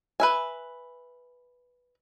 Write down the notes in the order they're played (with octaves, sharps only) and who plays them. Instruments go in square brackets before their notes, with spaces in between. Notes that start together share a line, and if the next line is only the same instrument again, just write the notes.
[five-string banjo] B4 E5 G#5